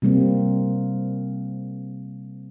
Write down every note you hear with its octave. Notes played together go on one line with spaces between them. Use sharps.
C3 G3 A#3 C4